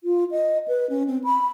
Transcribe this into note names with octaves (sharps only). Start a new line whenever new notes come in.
F4
D#5
B4
C#4
C4
B5